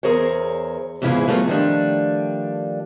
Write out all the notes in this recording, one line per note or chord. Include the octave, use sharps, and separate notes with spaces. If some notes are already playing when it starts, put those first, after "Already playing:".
E2 G#4 A#4 C5 C#5
E2 G#2 C#3 E4 F4 G#4
F#3 A3 B3 D#4 F4
D#3 F3 G3 A3 D4